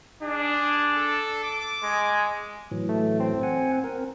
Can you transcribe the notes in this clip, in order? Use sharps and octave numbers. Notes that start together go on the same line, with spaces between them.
D4 G#4
A4
D6
G#3
A2 E3 F#3
A3
C4
F#5 G#5
C4 A#4